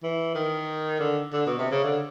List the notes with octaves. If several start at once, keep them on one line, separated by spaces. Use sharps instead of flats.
E3
D#3
D3
D3
B2
C3
C#3
D3